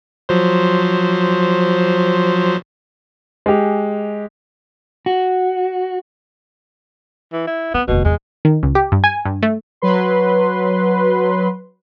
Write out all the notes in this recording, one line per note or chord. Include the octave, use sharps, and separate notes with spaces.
F3 F#3 C5
G#3 G4
F#4
E3
E4
B3 C4
F1 D#2 B2
E2 A#2 G#3
D#3
C#2
G4
G2
G#5
G2
A3
F#3 B4 C6